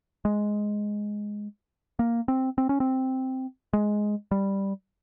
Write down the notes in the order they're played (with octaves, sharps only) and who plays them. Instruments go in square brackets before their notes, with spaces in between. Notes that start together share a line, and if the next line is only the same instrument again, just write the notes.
[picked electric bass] G#3
A#3
C4
C4
C#4
C4
G#3
G3